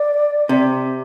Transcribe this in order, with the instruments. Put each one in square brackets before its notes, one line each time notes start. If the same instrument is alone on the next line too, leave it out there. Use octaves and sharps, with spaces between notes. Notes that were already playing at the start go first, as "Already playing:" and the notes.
Already playing: [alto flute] D5
[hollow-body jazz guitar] C3